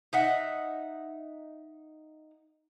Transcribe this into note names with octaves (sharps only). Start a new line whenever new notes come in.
D#4 E5 F#5